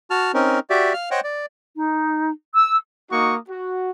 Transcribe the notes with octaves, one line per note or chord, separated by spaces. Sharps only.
F#4 A5 F6
C4 C#4 D#4 A#4
F#4 G4 D5 E5
F5 F6
C5 C#5 D#5 F#5 G5
D5
D#4
E6
A#3 D#4 F#4 C#6 D#6
F#4